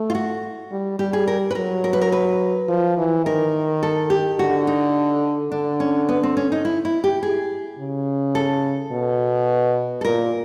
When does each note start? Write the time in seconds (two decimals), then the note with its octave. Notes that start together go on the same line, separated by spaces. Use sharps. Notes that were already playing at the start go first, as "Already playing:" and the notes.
Already playing: A3
0.10 F4
0.15 F#4
0.71 G3
0.99 G3 G4
1.13 G#4
1.28 A#4
1.51 B4
1.55 F#3 A#4
1.84 A#4
1.93 B4
2.01 A#4
2.12 B4
2.68 F3
2.97 E3
3.25 D#3 A#4
3.83 A4
4.10 G4
4.39 D3 F#4
4.67 D#4
5.52 D3 D4
5.80 C#4
6.09 B3
6.23 C4
6.37 C#4
6.52 D#4
6.65 E4
6.85 E4
7.04 G4
7.23 G#4
7.79 C#3
8.35 A4
8.92 B2
10.01 A4
10.05 A#2 A#4